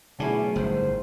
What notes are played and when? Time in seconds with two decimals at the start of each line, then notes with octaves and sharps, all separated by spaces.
0.20 B2 D3 F#3 A3 C#4 E4 F#4 G#4
0.56 G1 A2 D#3 C5